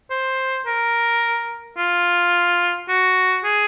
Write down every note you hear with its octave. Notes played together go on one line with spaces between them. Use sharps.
C5
A#4
F4
F#4
G#4